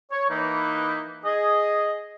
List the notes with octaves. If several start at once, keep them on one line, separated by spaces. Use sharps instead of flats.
C#5
E3 A#3 D#4 B4
G#4 D#5